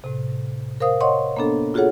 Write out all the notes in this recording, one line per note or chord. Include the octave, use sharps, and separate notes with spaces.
A2 C3
A#4 C5 F5 D#6
C#5 D#5 F#5 C6 C#6
A#3 B3 D4 A4
F4 F#4 G#4 A4 C#5 F#5